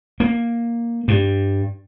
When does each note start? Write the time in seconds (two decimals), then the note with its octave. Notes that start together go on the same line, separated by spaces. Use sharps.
0.20 A#3
1.08 G2